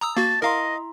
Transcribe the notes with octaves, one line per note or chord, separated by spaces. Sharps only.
A#5 D#6 E6
A#3 F#4 A5
E4 A#4 D#5 F5 A#5 C6